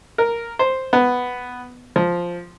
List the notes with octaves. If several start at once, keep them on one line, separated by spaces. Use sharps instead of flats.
A#4
C5
B3
F3